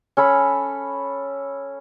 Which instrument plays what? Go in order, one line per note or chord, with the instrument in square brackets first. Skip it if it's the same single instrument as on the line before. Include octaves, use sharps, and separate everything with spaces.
[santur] C#4 A4 B5